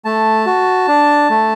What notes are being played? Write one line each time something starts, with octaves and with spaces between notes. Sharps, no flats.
A3 A5
F#4
D4
A3